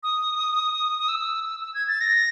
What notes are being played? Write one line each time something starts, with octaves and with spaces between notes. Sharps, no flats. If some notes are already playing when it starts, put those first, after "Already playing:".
D#6
D#6
E6
E6
G#6
A6
A#6